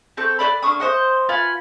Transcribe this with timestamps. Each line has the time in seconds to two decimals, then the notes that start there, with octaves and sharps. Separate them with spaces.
0.17 C4 A4 C#6 G6
0.39 B4 C5 D5 B5
0.62 A#3 D4 C#6 D#6
0.80 C5 D#5 F#5
1.29 F4 B4 F#5 G#5